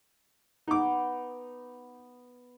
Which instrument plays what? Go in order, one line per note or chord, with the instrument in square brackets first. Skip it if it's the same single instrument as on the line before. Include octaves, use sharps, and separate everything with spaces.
[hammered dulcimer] B3 [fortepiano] D#4 D6